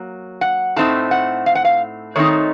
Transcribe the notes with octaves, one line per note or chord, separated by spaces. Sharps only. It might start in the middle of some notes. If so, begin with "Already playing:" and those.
Already playing: F#3 A#3
F#5
A2 A3 C4 D#4 A5
F#5
F5
F#5
F5
D#3 A3 C4 D#4 C#5